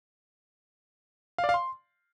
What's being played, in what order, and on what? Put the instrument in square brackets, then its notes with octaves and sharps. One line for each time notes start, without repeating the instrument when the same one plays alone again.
[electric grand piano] F5
D5
F5
C6